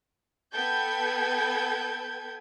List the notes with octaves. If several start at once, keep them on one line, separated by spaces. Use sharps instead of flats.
B3 A4 B4 G5 G6 G#6